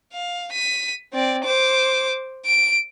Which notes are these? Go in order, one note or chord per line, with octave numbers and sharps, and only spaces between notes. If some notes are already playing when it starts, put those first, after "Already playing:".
F5
B6 D#7
C4 D5
C5 D6
D7